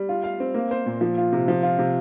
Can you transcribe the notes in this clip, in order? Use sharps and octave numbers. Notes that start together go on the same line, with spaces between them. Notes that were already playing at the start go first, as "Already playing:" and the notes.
Already playing: G3
F4
F5
C4
A#3
C5
A#2
F3
F4
C3
F3
F4
C3